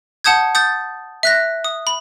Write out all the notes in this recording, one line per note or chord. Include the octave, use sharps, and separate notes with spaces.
F#5 A5 D#6 G6 G#6
D#6 G6 A6
E5 F#6 A#6
D#6
B5